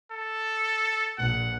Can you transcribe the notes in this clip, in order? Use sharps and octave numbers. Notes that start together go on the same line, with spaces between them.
A4
A#1 F#5